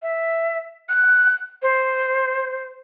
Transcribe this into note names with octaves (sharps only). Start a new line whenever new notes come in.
E5
F#6
C5